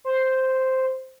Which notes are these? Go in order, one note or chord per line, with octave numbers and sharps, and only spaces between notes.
C5